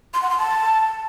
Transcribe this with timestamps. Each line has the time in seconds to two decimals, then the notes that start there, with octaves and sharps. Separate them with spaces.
0.14 C6
0.22 F#5
0.30 C6
0.39 A5